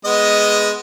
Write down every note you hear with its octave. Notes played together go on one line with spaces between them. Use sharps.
G#3 B3 D#5